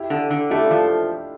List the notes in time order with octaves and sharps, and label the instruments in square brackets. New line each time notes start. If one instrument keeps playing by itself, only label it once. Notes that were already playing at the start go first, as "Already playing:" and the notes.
Already playing: [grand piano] E4 G4
[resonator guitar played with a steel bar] D3
D3
[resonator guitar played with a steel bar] A3 [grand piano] E4 G4
[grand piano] D4 F4
[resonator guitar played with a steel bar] F3